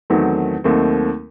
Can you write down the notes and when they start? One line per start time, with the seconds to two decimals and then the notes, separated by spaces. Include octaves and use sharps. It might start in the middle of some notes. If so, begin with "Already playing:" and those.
0.10 E2 D#3 F#3 A3 C4
0.64 D#2 D#3 F#3 A3 C4